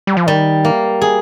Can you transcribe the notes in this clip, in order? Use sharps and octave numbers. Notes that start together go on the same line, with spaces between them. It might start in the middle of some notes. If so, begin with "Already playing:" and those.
G3
F3
D#3 G3
A#3
G#4